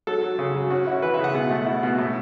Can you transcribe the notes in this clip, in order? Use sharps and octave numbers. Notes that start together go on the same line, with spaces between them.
F#3 A4
F#3
C#3
F#3
C#4 F#4
E4 F#4
E3 B4
E5
C#3
F#5
B2
A3
E4
B2
A2